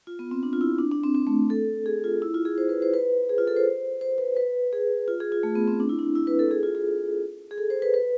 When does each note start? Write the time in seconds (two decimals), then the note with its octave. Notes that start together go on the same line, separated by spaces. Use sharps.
0.07 F4
0.19 B3
0.31 C4
0.43 D4
0.53 F4
0.61 E4
0.79 D4
0.91 D4
1.03 C4
1.15 C4
1.27 A3
1.50 A4
1.86 G#4
2.04 F4
2.22 E4
2.34 F4
2.45 G#4
2.58 C5
2.69 B4
2.82 C5
2.94 B4
3.29 G#4
3.38 F4
3.47 A4
3.56 C5
4.01 C5
4.18 B4
4.37 B4
4.73 G#4
5.08 F4
5.20 G#4
5.32 F4
5.43 A3
5.55 B3
5.68 C4
5.80 D4
5.89 E4
5.99 D4
6.15 E4
6.27 B4
6.39 A4
6.51 G#4
6.63 F4
6.75 G#4
7.51 G#4
7.58 A4
7.70 C5
7.82 B4
7.94 B4